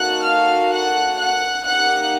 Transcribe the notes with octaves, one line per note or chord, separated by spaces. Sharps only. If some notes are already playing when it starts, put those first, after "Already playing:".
Already playing: A#3 D#4 F#4 A4 F#5 F#6
F5 F6
F#5 F#6
F#5 F#6
A#3 D#4 G4 F#5 F#6